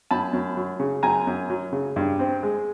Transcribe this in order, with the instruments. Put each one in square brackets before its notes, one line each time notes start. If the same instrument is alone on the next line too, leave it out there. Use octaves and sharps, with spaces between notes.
[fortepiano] F#2 A5 B5
F#2
F#3
C#3
F#2 G#5 A#5
F#2
F#3
C#3
G2
C4
G#3